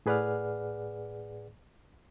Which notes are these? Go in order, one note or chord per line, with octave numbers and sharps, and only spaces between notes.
A2 G#4 B4 D5 F#5 F6